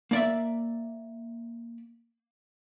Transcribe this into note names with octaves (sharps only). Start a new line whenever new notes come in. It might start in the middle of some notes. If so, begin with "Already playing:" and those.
A#3 D5 E5